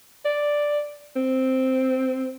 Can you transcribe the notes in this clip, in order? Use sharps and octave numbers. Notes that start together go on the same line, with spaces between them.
D5
C4